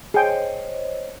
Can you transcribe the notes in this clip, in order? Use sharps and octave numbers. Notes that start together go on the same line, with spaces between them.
G#4 C5 C#5 D#5 G5